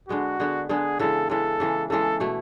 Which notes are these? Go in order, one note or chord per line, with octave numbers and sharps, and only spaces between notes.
D3 G#3 B3 F#4
D3 G#3 B3
D3 G#3 B3 G#4
C#3 E3 G#3 A4
C#3 E3 G#3 A4
C#3 E3 G#3
C#3 E3 G#3 A4
B2 A3 E4